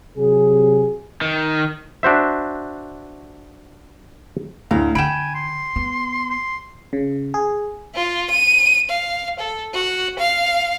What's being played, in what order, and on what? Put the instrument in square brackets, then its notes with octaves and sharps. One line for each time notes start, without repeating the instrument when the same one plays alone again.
[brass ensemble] C3 F#3 G#4
[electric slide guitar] D#3
[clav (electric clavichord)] D4 F#4 C5 E5
[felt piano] D2 A2 [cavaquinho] F5 A#5
[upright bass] D3 [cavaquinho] G5 B5 [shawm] G#5 [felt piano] D7 E7
[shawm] C6
[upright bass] B3
[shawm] C6
[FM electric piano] C#3
G#4
[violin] F4
D#7
F5
A4
F#4
F5